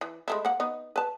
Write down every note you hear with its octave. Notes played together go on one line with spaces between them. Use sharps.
E3
G#3 A3 E4
A#3 F#5
B3 D#4
B4 A5